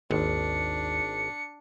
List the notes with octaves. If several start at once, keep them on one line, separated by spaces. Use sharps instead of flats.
G#1 D#2 D4 C#7